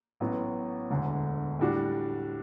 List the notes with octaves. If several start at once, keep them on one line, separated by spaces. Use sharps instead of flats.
A1 A2 F#3 B3
E1 D2 D3
A2 G3 D4 F#4